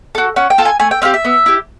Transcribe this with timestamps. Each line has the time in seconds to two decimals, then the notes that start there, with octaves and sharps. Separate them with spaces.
0.15 F#4 A4
0.36 C#4 F#5
0.50 G5
0.58 F4 A4
0.65 G#5
0.80 A3 G#5
0.91 G5
1.02 C4 E4 G4 F5
1.14 E5
1.25 B3
1.46 E4 G4